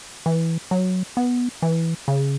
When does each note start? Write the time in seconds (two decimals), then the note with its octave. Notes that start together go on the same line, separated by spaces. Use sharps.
0.26 E3
0.71 F#3
1.17 B3
1.62 E3
2.08 C#3